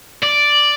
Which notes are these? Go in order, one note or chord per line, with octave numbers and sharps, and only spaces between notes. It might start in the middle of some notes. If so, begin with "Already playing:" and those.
D5